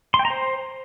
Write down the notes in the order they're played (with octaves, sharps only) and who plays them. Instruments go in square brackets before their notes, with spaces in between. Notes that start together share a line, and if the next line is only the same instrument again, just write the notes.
[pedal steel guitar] C6
G5
A#5
C5